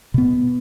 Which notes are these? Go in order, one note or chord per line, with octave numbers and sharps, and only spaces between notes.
B2 B3